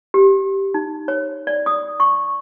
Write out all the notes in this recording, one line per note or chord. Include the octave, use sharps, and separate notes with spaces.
G4
D#4
C#5
D5
D#6
C#6